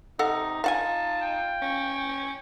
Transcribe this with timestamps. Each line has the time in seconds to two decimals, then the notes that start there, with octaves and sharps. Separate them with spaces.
0.19 C3 D#4 A4 F5 F#5
0.64 D#4 F4 F5 F#5 G#5 A5
1.21 G5
1.62 C#4